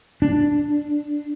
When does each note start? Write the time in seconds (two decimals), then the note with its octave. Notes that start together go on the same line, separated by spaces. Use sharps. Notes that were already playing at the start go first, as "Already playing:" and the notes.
0.22 D4